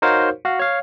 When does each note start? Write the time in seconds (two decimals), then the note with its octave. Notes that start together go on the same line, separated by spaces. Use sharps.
0.02 D#4 F#4 A#4 C5 C#5 F5
0.45 F#4 F5
0.59 C#5 F5